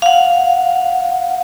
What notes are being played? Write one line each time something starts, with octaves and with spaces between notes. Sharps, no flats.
F5 F#5